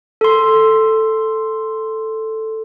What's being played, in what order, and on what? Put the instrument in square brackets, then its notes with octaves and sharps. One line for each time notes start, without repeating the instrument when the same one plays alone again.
[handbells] A4 C6